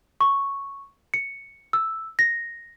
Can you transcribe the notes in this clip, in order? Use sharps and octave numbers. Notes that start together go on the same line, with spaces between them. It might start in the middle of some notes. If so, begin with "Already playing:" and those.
C#6
C#7
E6
A#6